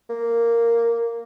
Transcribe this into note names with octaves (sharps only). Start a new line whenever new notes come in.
A#3